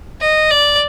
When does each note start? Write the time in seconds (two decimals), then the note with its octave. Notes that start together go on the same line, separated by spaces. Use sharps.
0.21 D#5
0.51 D5